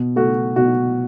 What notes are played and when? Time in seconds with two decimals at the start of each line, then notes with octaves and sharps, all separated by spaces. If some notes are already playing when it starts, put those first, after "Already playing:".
Already playing: B2
0.16 A3 F#4
0.56 B2 F#4